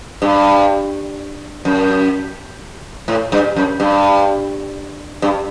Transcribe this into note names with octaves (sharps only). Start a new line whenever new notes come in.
G2
F#2
A2
G2
F#2
G2
G2